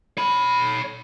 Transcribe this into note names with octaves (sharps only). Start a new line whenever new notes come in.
C#5 B5